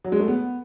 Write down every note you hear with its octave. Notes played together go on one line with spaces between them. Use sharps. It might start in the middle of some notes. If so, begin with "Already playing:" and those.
F#3
G#3
A3
B3